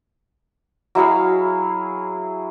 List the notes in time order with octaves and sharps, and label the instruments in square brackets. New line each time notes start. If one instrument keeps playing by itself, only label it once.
[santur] F#3 E4 G#4 F5